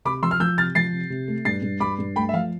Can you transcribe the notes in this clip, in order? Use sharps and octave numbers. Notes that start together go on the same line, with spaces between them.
C3 B5 D6
F3 C6 E6
F6
F3 E6 G6
C3 F6 A6
F3 A6 C7
C3
C3
A3
G2 A6 C7
G2
G2 B5 D6
G2
A3 G5 B5
E5
F3 F5